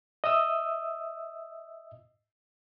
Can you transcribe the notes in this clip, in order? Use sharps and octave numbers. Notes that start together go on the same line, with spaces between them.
D#5 E5 D#6 E6